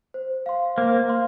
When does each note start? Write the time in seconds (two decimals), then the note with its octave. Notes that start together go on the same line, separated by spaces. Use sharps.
0.14 C5
0.46 F5 C6
0.78 A#3 C5
1.08 F5 C6